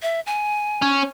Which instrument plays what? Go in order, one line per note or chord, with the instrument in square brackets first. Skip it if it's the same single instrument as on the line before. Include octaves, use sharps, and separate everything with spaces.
[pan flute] E5
G#5
[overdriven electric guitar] C#4